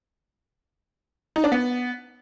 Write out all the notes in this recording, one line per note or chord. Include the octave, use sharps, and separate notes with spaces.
D#4
D4
B3